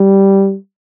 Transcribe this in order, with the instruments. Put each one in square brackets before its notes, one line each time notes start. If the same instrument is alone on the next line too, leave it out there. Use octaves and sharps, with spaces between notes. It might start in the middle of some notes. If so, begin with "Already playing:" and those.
Already playing: [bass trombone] G3